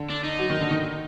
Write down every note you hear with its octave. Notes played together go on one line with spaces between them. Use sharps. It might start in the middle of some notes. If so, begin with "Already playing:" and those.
Already playing: D3
D4
D#4
F#3
D#3
D3
D#3